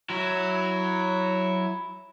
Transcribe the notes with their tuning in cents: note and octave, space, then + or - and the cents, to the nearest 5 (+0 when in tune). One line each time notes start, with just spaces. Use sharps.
F#3 +0 E4 +0